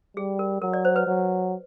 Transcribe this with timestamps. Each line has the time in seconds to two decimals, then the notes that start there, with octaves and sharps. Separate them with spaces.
0.17 G3 G#4
0.39 A#4
0.62 F#3 A#4
0.73 D5
0.85 C5
0.96 B4
1.07 F#3